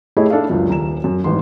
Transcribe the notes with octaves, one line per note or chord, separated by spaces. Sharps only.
A3 E4 G4 G#4 C#5 D#5
D4 A4 E5 F5
C#2 F#2
D#1 A#5 E7
F#2
A1 G#2 C6